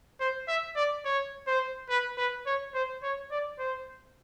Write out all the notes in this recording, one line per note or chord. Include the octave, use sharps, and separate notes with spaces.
C5
E5
D5
C#5
C5
B4
B4
C#5
C5
C#5
D5
C5